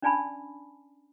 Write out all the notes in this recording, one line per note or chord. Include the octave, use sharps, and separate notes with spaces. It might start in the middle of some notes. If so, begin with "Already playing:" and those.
C#4 D4 D5 G#5 A5 B5